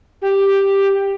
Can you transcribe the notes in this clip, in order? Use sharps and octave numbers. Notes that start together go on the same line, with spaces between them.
G4